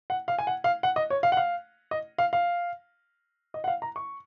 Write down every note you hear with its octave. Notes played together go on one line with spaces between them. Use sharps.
F#5
F5
G#5
F#5
F5
F#5
D#5
C#5
F5
F#5
F5
D#5
F5
F5
D#5
F#5
F5
A#5
C#6